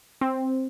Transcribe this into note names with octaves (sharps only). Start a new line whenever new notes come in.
C4